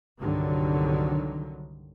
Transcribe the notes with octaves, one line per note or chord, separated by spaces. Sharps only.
C2 G2 D3 D#3 F#3